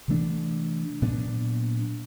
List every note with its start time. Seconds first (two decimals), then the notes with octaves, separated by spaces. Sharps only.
0.08 C3 E3 A3 D4
1.02 A#2 F#3 B3 D4